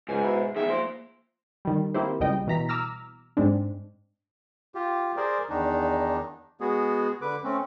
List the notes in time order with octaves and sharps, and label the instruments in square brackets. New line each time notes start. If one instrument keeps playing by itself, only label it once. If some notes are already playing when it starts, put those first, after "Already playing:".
[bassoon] C#2 [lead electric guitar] G#2 [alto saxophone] G#5
[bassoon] B2 [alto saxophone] E4
[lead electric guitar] E2 D#3 [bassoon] G#4 [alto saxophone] E5
[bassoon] F3 [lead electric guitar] A#3 C6
[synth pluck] D#3 G3
A#3 C4 E4 G4 C5
C#2 G3 D#5 G5
B2 E3 A#5 B6
A#5 D6 E6 F6 A#6
G#2 G#3 C4 D4
[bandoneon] F4 G4
G#4 A#4 C5 D5
E2 D#3 D4 D#4
G#3 B3 F#4 G#4
D3 B4 D6
A3 C4 C#4